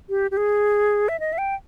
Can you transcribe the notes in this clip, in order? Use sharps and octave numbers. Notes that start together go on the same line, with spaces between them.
G4
G4
G#4
E5
D#5
E5
G5